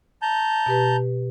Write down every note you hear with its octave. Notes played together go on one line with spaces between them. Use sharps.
A5 A#5 G6
B2 G4 B4